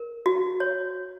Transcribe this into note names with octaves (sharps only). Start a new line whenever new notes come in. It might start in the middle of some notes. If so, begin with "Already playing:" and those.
Already playing: A#4
F#4
C#5